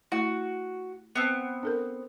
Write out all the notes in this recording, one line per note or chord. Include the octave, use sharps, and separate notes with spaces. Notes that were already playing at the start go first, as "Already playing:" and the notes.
A3 E4 F#4
B3 C4
D4 A4 A#4